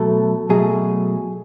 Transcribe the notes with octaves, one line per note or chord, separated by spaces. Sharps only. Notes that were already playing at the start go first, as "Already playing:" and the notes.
Already playing: B2 F#3 A3 A4
B2 F#3 A3 G#4